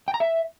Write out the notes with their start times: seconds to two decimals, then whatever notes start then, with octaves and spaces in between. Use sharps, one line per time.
0.08 G5
0.14 A#5
0.20 E5